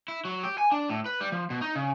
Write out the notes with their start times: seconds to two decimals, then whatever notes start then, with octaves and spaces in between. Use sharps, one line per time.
0.08 E4
0.25 F#3
0.43 G4
0.58 G#5
0.72 D4
0.90 A2
1.06 B4
1.21 G3
1.32 F3
1.50 B2
1.61 D#4
1.75 C#3